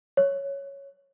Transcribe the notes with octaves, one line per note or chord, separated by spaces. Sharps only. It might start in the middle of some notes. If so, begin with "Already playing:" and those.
C#5